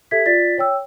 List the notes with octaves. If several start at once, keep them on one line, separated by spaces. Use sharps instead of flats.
G4 A4 E5 G#6 B6
F4 D5 A6 B6
C#5 G5 E6